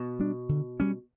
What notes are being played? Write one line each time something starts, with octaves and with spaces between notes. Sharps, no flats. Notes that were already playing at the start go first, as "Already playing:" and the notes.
Already playing: B2
G3 D4
D3
G3 C#4